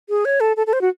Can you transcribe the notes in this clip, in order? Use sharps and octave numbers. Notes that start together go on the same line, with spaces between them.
G#4
C#5
A4
A4
A4
C5
F#4